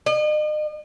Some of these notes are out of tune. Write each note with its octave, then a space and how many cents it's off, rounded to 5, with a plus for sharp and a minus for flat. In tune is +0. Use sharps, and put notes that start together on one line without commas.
D#5 -40